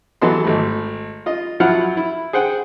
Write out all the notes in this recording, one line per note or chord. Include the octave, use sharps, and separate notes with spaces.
E3 F#3 B3 A4 D#5 C6
G#1 A3
F4 D#5
F3 F#3 E4 F4 F#5 F6
E4
G#4 C5 F#5 G5